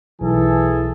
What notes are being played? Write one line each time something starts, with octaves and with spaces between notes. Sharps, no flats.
B1 E3 G#4 A4